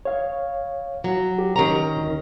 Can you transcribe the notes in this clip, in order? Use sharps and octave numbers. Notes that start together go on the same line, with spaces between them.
C#5 F5
F#3
G4
D#3 C#4 A#5
D2